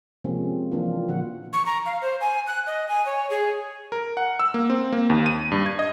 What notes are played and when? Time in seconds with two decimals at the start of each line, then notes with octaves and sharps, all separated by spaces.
0.24 C3 F3 G#3 A#3 C4 C#4
0.72 E3 F3 A#3 C4 D4 F4
1.08 A#2 D3 F3 F#4 F#5
1.53 C#6
1.66 A#5
1.86 F5
2.02 C5
2.21 G#5
2.47 F#6
2.67 D#5
2.88 G#5
3.06 C#5
3.30 G#4
3.92 A#4
4.17 F#5
4.39 E6
4.54 A#3
4.70 C4
4.92 A#3
5.10 D#2
5.26 D#7
5.51 G2
5.66 G#6
5.79 D#5